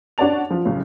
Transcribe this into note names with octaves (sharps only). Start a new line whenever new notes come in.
D4 F#4 C#5 D5 A5 F7
F3
B1 A2 C#3